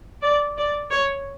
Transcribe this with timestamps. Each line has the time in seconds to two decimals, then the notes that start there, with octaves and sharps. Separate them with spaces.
0.23 D5
0.57 D5
0.90 C#5